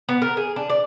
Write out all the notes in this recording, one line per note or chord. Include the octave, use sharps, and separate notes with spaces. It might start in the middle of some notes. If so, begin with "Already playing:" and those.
B3
A#4
G#4
D4
D5